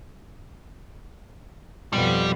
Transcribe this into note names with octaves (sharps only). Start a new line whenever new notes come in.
F2 B2 G3